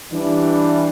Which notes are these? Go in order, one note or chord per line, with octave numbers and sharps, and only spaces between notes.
E3 G3 D4